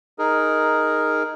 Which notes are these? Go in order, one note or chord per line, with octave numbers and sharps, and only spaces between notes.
D#4 G#4 A#4